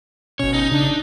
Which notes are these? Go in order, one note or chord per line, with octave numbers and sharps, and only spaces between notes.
G1 B2 C#4 C#5
D#4
C#3 D4